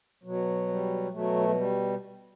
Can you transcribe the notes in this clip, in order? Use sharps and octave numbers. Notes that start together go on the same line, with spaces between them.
B2 F#3
G3
B2 F#3 A3
F#3
G3